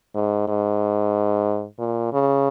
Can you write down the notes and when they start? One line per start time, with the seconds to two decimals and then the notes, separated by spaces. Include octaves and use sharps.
0.15 G#2
0.48 G#2
1.79 A#2
2.13 C#3